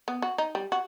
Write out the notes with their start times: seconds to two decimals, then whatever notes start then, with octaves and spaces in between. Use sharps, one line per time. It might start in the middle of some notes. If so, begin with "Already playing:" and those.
0.08 B3
0.22 F#4
0.38 D#4
0.55 G3
0.72 F#4